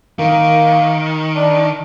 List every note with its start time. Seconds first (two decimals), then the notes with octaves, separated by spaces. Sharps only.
0.19 D#3 A#3
1.36 D4